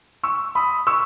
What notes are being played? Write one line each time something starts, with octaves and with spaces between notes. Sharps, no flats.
C#6 E6
B5 D#6
C#6 E6